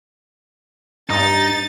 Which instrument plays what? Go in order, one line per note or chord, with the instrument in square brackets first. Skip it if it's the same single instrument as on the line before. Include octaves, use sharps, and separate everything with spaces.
[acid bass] G2 [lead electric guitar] D#4 [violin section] A6